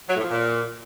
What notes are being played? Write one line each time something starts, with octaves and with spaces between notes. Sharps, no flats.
F#3
A2
F3
A#2